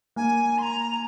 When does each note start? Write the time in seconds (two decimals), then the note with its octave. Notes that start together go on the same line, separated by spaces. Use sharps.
0.16 A#3 G#5
0.58 C6
0.62 A#5